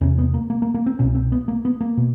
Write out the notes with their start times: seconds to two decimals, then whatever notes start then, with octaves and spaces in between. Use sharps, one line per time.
0.01 E2 C3 C#4
0.18 B3
0.34 A#3
0.50 A#3
0.62 A#3
0.74 A#3
0.86 C4
0.99 C2 B2 C#4
1.15 C4
1.32 B3
1.48 A#3
1.65 B3
1.81 A#3
1.97 B2